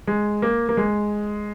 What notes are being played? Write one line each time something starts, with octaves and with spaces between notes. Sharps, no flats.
G#3
A#3
A#3
G#3